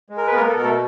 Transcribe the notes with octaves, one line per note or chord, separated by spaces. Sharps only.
G#3
A#4
B4
A#3 B3 A#4
A4
B2 A#4
A3 A4